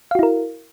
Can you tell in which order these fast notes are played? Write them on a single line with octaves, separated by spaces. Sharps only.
F5 F#4 E4 A#4